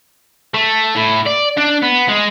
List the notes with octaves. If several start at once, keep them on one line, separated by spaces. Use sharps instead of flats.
A3
A2
D5
D4
B3
G#3